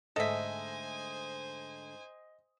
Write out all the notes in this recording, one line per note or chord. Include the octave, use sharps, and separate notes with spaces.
G#2 D3 A3 A4 C5 D#5 E5 G#5